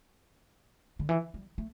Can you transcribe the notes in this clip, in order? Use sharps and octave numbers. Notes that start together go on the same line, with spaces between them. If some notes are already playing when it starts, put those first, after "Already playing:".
D3
E3
G3
A3